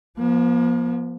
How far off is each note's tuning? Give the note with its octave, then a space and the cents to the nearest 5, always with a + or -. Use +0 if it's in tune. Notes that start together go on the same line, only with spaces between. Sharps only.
F3 +0 A#3 +45